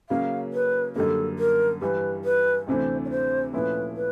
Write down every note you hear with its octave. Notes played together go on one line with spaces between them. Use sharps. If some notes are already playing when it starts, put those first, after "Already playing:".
C#3 F#3 A#3 C#4 F5
B4
F#2 D3 G3 A#3 A4
A#4
G2 E3 G3 B4
B4
D2 C3 E3 A3 D4 C5
C#5
C5
A#2 F3 A3 C#4 E4 B4
B4